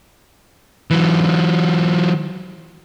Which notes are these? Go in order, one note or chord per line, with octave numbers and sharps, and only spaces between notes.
E3 F#3